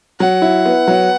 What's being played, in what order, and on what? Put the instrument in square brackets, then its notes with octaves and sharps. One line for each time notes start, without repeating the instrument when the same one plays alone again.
[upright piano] F#3 [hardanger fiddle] F#5
[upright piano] E4
B3
F#3